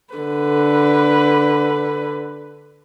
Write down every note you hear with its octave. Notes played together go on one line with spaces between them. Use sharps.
D3 B4